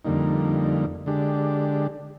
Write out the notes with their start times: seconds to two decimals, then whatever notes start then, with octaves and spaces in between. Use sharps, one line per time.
0.05 F2 D3 G3 A#3 D#4
1.06 D3 G#3 D4 G4